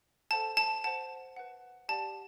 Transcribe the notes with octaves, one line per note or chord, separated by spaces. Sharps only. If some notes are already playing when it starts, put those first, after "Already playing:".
A4 C5 F#5 A5
A5
C5 F#5 A5
B4 F#5
G4 D5 F#5 A5